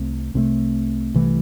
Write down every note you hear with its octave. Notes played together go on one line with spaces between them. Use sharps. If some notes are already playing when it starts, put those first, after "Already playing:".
Already playing: C2 C3 A3
C2 C3 E3 A3
C2 C3 E3 A3